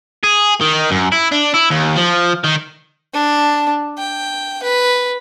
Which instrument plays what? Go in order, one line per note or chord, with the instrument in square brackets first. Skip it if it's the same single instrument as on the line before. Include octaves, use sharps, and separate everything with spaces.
[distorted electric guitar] G#4
D#3
F#2
E4
D4
E4
D#2
F3
D#3
[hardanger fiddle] D4
G5
B4